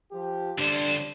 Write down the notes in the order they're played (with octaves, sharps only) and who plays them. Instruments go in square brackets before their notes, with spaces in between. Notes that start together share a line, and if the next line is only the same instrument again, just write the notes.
[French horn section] F3 G4
[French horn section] F2 G3 D4 [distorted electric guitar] D3 C5